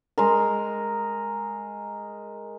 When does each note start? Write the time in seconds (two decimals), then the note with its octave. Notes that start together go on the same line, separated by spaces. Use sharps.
0.18 G#3 A#4